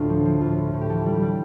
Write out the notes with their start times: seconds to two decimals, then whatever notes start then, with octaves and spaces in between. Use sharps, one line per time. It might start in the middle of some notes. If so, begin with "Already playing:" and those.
Already playing: D2 A2 D4 F4
0.09 F3
0.25 F3
0.41 A2 F4
0.58 A2
0.74 A2
0.81 G4
0.90 E3 A4
1.06 G3
1.14 G4
1.22 G3